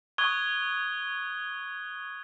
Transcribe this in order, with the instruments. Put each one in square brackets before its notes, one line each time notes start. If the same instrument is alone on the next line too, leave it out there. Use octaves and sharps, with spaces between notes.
[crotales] C#6 D#6 F#6 G#6 G7